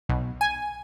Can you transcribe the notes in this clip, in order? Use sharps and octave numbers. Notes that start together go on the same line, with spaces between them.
B1
G#5